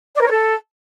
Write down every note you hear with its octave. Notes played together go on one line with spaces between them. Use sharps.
D5
A#4
C#5
A4